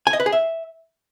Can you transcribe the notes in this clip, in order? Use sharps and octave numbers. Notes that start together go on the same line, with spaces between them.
G#5
D#5
B4
G#4
E5